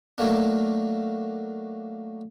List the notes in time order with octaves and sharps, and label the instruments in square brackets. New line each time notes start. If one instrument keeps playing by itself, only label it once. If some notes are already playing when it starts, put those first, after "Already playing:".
[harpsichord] F#3 A3 A#3 D4